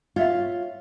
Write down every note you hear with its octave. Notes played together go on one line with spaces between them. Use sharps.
F4 C#5 E5 F5